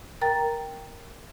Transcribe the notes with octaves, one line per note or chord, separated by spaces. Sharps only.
A#4 G5 A#5 A6